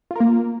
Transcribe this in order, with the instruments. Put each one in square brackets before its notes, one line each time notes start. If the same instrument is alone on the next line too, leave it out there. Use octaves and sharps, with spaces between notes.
[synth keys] F4
A#4
A#3